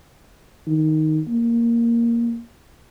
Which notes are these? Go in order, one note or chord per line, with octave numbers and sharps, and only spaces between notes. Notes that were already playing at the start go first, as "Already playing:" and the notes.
D#3
A#3